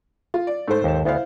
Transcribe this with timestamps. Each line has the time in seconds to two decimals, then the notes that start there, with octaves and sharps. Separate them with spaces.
0.34 F4
0.47 D5
0.68 G#2 A3 A4 C5
0.84 D#2 A5
1.05 D2 B3 E4 C5 F5